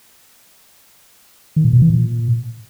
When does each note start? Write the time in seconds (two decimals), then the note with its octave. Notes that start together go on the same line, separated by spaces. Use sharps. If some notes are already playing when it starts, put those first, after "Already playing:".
1.56 D#3
1.65 A#2
1.73 B2
1.82 E3
1.90 A#2